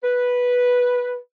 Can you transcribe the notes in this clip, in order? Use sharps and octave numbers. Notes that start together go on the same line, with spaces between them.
B4